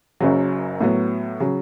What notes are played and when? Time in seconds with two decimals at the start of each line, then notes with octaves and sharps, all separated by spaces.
0.21 F#1 F#2 C#3 F#3
0.81 A2 F#3 B3
1.40 C#3 F#3